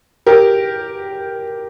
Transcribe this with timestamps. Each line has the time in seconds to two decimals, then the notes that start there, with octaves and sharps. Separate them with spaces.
0.27 G4 A#4